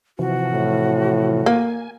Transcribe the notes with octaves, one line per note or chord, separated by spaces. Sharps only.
C3 E3 F3 F#4
A2
A#3 G#5